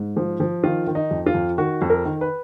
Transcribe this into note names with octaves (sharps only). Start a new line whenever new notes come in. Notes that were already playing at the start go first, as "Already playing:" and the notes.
Already playing: G#2
F3
F3
D#3 F4
D#3
D#4
F2
F4
F2
D#3 F#4
F2
A#4
D#3
B4